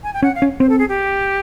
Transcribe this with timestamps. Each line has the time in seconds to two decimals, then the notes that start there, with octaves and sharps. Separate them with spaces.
0.04 G#5
0.14 G5
0.22 C#4 F#5
0.35 F5
0.42 C#4
0.60 C4 C5
0.69 A4
0.79 G#4
0.89 G4